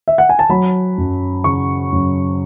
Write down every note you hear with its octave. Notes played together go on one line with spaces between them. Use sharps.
E5
F#5
G#5
A5
F#3 B5
F#2
C#3 C#6
F#2